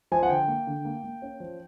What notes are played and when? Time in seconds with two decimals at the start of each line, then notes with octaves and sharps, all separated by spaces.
0.12 F3 G#5
0.23 F#5
0.29 D3 G5
0.48 A#3
0.67 D3
0.85 A#3
1.04 A#3
1.22 C#4
1.40 F3